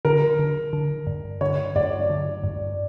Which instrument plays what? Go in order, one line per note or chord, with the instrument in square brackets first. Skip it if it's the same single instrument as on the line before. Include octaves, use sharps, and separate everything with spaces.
[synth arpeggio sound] D3 [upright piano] A#4
[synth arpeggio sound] D3
D3
G2
[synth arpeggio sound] D3 [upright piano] C#5
[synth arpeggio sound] G2 [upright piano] D5
[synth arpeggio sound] D3
G2